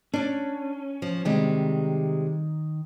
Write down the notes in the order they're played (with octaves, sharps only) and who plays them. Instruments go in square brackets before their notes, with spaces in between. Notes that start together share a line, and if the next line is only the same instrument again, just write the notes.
[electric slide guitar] C#4 [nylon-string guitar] D4 D5
[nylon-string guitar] F3
[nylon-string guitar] C3 G3 G#3 [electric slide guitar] D#3